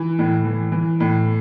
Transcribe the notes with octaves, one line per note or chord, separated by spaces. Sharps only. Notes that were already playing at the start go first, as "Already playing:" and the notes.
Already playing: E3
A2
E3
E3
A2